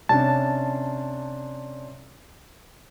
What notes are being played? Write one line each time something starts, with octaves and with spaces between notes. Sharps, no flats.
C3 C#4 D4 A5